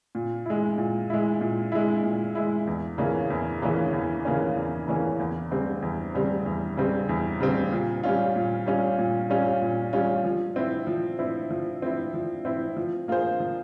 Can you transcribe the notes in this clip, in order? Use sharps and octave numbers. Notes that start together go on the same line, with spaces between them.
A#2
G#3 E4
A#2
G#3 E4
A#2
G#3 E4
A#2
G#3 E4
E2
C#3 E3 A#3 C#4
E2
C#3 E3 A#3 C#4
E2
C#3 E3 A#3 C#4
E2
C#3 E3 A#3 C#4
E2
C#3 G3 C4
E2
C#3 G3 C4
E2
C#3 G3 C4
E2
C#3 G3 C4
A#2
G3 C#4 F4
A#2
G3 C#4 F4
A#2
G3 C#4 F4
A#2
G3 C#4 F4
F3
C4 E4
F3
C4 E4
F3
C4 E4
F3
C4 E4
F3
A#3 F4 G#4 C5
F3